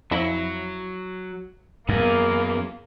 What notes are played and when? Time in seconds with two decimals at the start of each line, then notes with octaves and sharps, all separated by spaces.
0.11 F2 F#3 E4 A#6
1.89 F#2 A#3 B3 G#4 B4